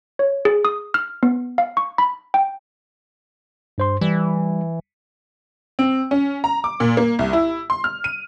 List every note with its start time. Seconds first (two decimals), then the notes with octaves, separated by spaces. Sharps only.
0.19 C#5
0.45 G#4
0.65 D#6
0.94 F6
1.23 B3
1.58 F5
1.77 C#6
1.98 B5
2.34 G5
3.78 G2 C5 C6
4.01 E3 G3
5.79 C4
6.11 C#4
6.44 A#5
6.64 D6
6.80 A#2
6.97 A#3
7.19 C2
7.33 E4
7.70 C6
7.84 F6
8.04 D#7